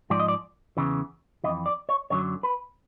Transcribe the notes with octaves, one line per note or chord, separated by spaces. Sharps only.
G#2 F3 D5
D#5
D5
E2 C#3 E3
F2 C3 E3 D#5
D5
C#5
F#2 D3 F#3 C#5
B4